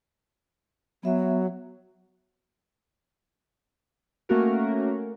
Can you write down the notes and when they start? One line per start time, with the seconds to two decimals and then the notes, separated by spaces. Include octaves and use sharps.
1.03 F#3 B3 E5
4.29 A3 A#3 C#4 F#4 A#4